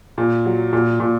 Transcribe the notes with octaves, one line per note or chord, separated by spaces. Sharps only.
A#2
F#3
A#2
A#2